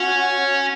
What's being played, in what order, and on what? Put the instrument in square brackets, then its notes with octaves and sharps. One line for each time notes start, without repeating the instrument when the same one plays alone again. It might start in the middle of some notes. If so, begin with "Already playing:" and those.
Already playing: [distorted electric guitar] C#4 [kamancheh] F#4